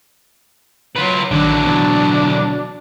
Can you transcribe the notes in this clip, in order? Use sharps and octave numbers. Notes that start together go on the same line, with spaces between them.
F#3 F4 B4
A#1 D3 D#3 F#3 D4 D6
B2 E3 A6